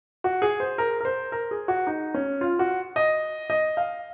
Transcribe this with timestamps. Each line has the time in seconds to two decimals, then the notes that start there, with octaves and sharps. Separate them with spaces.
0.24 F#4
0.42 G#4
0.60 C5
0.78 A#4
1.01 A#4
1.05 C5
1.32 A#4
1.51 G#4
1.68 F#4
1.87 D#4
2.14 C#4
2.41 F4
2.59 F#4
2.96 D#5
3.50 D#5
3.77 F5